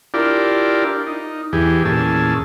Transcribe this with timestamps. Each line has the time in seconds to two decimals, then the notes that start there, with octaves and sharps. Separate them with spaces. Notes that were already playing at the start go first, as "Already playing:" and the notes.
0.14 D4 E4 F4 G4 A#4 D5
1.07 D#4
1.53 E2 E3 G4 G#4
1.85 E2 A#2 C#4 G#4 A5 E6